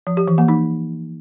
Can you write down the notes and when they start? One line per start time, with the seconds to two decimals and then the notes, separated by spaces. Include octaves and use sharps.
0.07 F3
0.17 G4
0.28 E3
0.38 A#3
0.48 D#4